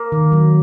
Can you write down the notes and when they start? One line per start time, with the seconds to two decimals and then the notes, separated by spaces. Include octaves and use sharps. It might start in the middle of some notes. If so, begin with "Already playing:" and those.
Already playing: A#3
0.12 D#3
0.32 F#3